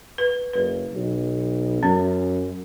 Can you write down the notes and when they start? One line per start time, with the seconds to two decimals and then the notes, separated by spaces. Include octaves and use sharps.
0.18 B4
0.53 F#1 B4
0.94 B1
1.83 F#2 C#4